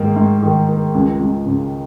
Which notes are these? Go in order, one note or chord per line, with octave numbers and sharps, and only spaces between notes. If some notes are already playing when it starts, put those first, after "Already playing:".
Already playing: G#2 D#3 A#3
G#2
D#3
A#3
C#2
C#2
C#3